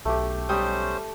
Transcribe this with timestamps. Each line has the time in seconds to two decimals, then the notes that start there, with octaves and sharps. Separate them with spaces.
0.05 B1 A3 G4
0.49 G3 C#4 C5 G5 D#6